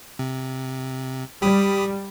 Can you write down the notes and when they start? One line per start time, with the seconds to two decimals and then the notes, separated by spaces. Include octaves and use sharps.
0.19 C3
1.42 G3 G4 B5 D#6